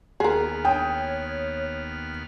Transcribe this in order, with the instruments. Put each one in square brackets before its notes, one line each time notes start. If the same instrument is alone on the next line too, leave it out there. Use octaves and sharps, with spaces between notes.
[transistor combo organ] D#2 B3 F6 [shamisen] G#4 A#4
[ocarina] C#5 [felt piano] G5 D#6